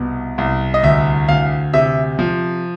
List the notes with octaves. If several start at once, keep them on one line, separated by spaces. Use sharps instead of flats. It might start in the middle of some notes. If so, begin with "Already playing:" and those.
Already playing: C2 B2
C2
D#5
D2 E5
D2 F5
C3 E5
F3